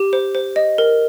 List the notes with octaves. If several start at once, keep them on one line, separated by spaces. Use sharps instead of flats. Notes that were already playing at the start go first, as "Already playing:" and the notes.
Already playing: G4
C5
C5
D#5
A#4